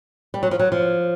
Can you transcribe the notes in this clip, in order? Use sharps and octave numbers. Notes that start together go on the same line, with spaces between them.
G3
F#3
F3
F#3
F3